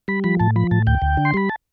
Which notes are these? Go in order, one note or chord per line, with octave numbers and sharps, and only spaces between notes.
G3 B5
F3 B5
A2 A5
F3 B5
A2 A5
D2 G5
D2
D3
C6
G3 B5
A5